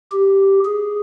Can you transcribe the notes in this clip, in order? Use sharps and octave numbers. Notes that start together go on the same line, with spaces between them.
G4
G#4